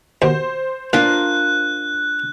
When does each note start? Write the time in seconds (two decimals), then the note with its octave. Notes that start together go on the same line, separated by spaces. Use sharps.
0.22 D#2 B2 C5
0.93 A#2 D4 F4 A#4 F#6